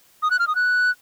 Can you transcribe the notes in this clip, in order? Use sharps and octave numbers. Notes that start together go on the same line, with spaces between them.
D#6
F#6
F6
D#6
F#6